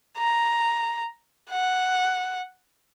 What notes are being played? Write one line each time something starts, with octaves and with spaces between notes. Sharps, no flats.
A#5
F#5